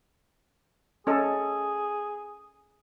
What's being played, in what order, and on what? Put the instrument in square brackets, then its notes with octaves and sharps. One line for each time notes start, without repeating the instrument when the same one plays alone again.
[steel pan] C#4 A4 D#5 [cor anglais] G#4